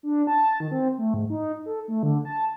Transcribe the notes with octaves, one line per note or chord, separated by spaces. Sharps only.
D4
A5
D#3
C4
A3
G#2
D#4
A4
A3
D3
A5